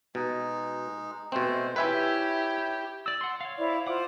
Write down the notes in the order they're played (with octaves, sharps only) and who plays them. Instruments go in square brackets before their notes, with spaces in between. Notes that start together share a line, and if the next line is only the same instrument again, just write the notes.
[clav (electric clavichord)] B2 [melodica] G#3 D#4
[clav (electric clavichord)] B2 C4 [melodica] G#3 A3 C5
[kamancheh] E4 G4 [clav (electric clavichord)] B4 E5 G#5 [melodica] C#5
[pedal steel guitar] D5 E6
F#5 C6
C#5 F5
[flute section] E4 C5 D5
[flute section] F4 C5 [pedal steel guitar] F#5 D6